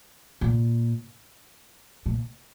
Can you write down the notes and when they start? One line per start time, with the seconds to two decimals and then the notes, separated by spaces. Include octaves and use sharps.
0.41 A#2
2.06 A#2